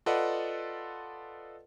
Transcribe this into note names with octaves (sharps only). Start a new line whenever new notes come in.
F4 A4 B4 D5 D#5 F#5